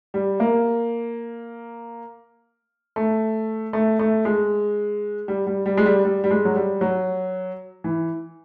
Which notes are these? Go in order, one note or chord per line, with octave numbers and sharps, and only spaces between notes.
G3
A#3
A3
A3
A3
G#3
G3
G3
G3
G#3
G3
G3
G3
G#3
F#3
G3
F#3
E3